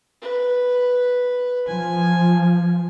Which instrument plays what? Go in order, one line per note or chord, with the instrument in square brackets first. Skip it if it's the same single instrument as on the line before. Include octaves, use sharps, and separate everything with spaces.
[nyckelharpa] B4
[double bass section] F3 [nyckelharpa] G#5